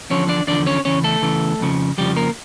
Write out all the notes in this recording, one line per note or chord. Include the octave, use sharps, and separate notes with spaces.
E2 D3 F3 C#4 C#5
D4 D5
E2 D3 F3 D4 D5
C#4 C#5
E2 C#3 E3 C#4 C#5
A3 A4
E2 C#3 E3
F2 C#3 F3
F2 C#3 F3 G3 G4
A#3 A#4